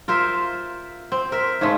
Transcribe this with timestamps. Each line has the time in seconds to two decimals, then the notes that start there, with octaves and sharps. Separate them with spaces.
0.08 F4 A#4 C5 E5
1.12 C4
1.32 A#4 E5
1.61 G#2 C#3 G#3 A3